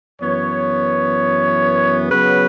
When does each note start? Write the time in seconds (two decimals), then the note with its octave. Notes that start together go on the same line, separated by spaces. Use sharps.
0.20 F#2 E3 B3 C#5
2.10 C#3 F#3 B3 B4